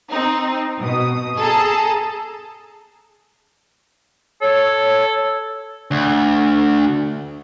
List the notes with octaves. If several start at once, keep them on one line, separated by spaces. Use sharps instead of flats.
C4 D#4
B2 D#6
G#4 A4 A5 A#5
A4 C#5
D2